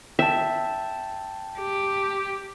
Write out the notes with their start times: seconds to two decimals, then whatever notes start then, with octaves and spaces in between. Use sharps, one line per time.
0.19 E5 G5 A5
1.58 G4